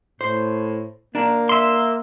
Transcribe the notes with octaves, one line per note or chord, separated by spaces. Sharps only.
A2 C5
A#3 D4 A#4
E5 C6